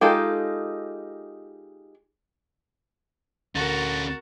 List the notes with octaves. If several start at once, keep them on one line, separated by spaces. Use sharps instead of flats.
G#3 D#4 F4 G4 A4
D2 C#4 F#4 A4 A#4 A6